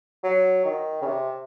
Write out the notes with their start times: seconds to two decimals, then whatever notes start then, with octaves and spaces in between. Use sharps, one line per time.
0.24 F#3
0.65 D#3
1.02 C#3
1.06 C3